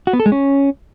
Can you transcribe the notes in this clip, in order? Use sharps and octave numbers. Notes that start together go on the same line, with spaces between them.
F#4
B3
A4
G#3
C#4